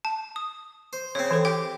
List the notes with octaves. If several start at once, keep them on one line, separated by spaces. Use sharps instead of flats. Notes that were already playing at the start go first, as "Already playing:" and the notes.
A5
D#6
C5
C#3 C4 C#5
E3 A4 C5
G4 G5